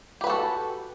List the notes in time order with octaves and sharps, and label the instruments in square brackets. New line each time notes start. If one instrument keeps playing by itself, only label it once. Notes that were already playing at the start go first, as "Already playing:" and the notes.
[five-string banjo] G4
B4
F#4
A4